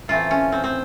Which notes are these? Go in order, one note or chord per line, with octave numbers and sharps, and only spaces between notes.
A2 E3 A3 C4 F4
C#4
C4
C4